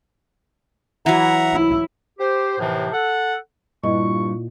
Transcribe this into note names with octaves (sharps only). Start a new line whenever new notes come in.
E3 F#3 E5 F#5 A#5
E4
G4 C5
D#2 A2 C3 E3 F3
A4 F#5
G2 A#2 E4 F4 D#5 C#6